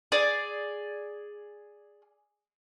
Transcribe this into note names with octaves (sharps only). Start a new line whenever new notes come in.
G#4 D5